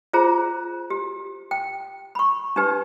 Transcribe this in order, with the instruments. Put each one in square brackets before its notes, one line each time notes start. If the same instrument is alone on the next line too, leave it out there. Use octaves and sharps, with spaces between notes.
[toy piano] F4 G#4 C5 A#5
G4
G5
B5 C#6
D4 D#4 G4 B4